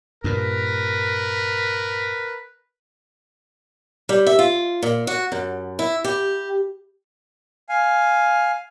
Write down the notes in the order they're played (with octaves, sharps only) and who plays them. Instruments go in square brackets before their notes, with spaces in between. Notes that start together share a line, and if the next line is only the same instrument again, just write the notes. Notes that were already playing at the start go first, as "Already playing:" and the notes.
[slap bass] G2 A#2 [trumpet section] A#4 B4
[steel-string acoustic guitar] G3
E5
F4
A#2
F#4
F#2
E4
G4
[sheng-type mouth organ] F5 G#5